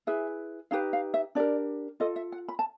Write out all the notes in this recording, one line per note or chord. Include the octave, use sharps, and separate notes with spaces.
E4 G#4 B4 E5
D#4 G4 B4 F5
F5
E5
D4 G4 A#4 D5
F4 A4 D#5
E5
F#5
B5
A5